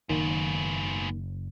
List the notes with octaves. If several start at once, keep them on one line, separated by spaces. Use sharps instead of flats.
F#1 G#2 B2 D#3 A#3